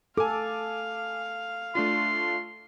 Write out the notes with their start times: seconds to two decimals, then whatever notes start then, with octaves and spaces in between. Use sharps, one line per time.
0.18 A4 F5 G#5 D6
1.75 A3 D4 F4 C6